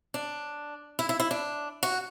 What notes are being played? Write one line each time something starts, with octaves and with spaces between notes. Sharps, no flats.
D4
E4
E4
E4
D4
F#4